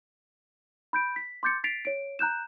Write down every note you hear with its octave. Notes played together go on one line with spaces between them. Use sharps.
B5 G6 D7
B6
C6 D6 G6 A6 C#7
A6 B6 C7 D7 F7
C#5 D7
A#5 F#6 G6 E7